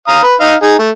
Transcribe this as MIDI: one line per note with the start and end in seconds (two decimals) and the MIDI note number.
0.08 0.22 77
0.08 0.22 82
0.08 0.22 87
0.23 0.35 71
0.40 0.54 63
0.40 0.54 75
0.40 0.54 77
0.62 0.74 63
0.62 0.74 68
0.79 0.90 57